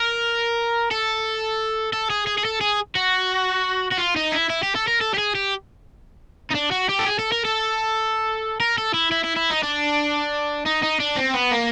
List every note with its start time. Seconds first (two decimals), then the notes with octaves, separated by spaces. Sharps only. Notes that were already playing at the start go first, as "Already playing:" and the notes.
Already playing: A#4
0.91 A4
1.93 A4
2.10 G#4
2.27 G#4
2.38 G#4
2.45 A4
2.61 G#4
2.95 F#4
3.91 F#4
3.98 F4
4.16 D#4
4.32 E4
4.50 E4
4.63 G4
4.75 A4
4.88 A#4
5.01 A4
5.14 G4
5.18 G#4
5.35 G4
6.51 D#4
6.55 D4
6.72 F#4
6.89 G4
6.99 A4
7.06 G#4
7.19 A4
7.32 A#4
7.45 A4
8.60 A#4
8.78 A4
8.94 E4
9.12 E4
9.24 E4
9.37 E4
9.51 D#4
9.63 D4
10.66 D#4
10.82 D#4
11.00 D4
11.16 C4
11.34 B3
11.51 A#3